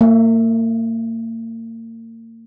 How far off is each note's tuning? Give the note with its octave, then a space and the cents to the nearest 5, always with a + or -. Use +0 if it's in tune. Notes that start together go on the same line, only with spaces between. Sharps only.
A#3 -40 E5 +0